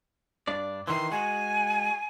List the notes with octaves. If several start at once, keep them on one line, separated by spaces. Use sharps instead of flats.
G2 D4 D5
D#3 E3 C6
G#3 F#4 G#5